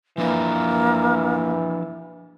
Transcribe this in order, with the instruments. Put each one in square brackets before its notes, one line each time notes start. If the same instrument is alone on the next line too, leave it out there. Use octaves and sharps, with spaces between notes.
[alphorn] E3 [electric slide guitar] F3 D4 B4 [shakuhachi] A#3